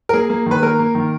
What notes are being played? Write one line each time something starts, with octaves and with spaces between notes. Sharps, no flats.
A#4
A#3 G#4
A#3
D#3 B4
A#3 A#4
A#3
D#3